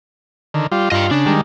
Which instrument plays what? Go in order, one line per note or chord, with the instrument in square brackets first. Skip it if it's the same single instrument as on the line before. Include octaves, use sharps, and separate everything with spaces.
[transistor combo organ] D3 D#3
G3 F4
[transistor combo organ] G2 F4 [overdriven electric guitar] D#5 G5
[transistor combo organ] C#3 [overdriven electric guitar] D4
[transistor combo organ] D#3 G3 G#3